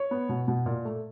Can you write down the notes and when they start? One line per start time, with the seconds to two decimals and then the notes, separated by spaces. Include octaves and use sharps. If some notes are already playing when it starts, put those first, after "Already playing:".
Already playing: C#5
0.11 B3
0.29 B2
0.48 B2
0.66 A#2
0.85 A3